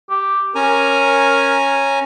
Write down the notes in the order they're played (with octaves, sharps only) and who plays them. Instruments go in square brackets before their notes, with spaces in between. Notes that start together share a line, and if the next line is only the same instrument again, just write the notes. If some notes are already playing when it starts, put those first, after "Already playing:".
[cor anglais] G4
[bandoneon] C#4 G#5 A#5 [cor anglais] A#4